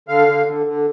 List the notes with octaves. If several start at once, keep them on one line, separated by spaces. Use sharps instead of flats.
D3 F5
D3
D3
D3